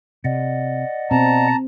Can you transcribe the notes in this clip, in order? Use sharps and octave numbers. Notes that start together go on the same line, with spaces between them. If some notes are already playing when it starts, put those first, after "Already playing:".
C3 D5 D#5 F#5
B2 C4 A5 A#5